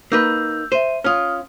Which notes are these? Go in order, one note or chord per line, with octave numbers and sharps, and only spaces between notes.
A#3 D#4 B4 E6 G6
C5 E5 D#7
C#4 F4 D#6 F6